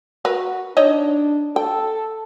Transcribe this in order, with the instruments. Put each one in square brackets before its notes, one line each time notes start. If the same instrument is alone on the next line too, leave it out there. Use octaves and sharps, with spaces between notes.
[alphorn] F#4 [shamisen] A#4 B4
[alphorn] D4 [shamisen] D#4 C#5 D#5
[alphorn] A4 [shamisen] G5